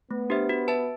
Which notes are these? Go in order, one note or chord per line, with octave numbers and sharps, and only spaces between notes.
A3 B3
D4 G4 C5 E5
F#4
B4 E5 A5